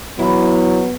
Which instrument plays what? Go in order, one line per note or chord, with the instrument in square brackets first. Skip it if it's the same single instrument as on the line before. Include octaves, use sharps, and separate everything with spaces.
[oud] E2 E4 [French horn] F#3 [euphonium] B3